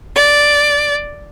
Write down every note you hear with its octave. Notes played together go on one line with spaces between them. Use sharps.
D5